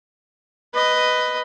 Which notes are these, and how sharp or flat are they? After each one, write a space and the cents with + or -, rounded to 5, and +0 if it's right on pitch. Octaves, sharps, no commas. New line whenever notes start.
B4 +10 D#5 +0